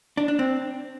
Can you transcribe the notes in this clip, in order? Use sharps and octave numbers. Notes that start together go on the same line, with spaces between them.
D4
D4
C4